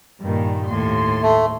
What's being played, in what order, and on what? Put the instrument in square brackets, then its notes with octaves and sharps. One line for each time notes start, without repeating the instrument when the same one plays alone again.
[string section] G2 A#2 D#3
[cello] D#2 A2 [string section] C6
[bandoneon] A3